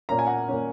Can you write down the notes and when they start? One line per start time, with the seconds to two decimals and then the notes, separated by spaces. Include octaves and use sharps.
0.09 A#2 A#3 C#4 A#5
0.19 G#5
0.27 F#5 A#5
0.48 A#2 A#3 C#4